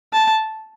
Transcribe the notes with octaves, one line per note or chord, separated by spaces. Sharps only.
A5